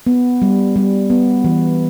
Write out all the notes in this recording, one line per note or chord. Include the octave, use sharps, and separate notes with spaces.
B3
G3
G3
B3
E3